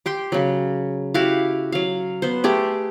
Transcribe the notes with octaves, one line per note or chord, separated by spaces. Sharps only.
G4 G5 C6
C#3 F#3
E4 F#4 G4 F5
F#3 F5
B3 C5
A3 G4 G#4